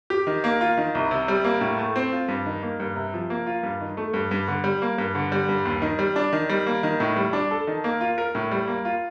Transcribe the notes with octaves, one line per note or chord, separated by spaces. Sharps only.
G4
D#3
A#3
F4
D#3
C2
C3
G3
A#3
A2
A3
C4
F4
G2
D#3
A#3
G2
C3
F3
A#3
F4
G2
D#3
A3
G2
G2
D3
G3
A#3
G2
D3
G3
G2
D#2
D#3
G3
D4
D#3
G3
A#3
D#3
A2
G3
D4
A4
D#3
A#3
F4
A#4
A2
G3
A#3
F4